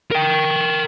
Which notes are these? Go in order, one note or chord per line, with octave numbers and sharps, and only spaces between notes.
A#4 G5